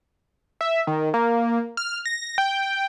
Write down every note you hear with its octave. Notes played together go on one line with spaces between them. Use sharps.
E5
D#3
A#3
F6
A#6
G5